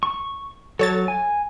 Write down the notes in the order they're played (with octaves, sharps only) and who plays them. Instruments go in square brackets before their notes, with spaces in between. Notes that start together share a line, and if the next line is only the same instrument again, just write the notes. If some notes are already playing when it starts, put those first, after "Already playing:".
[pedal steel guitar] C#6
[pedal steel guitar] F#3 [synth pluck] A4 C#5 A6
[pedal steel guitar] G#5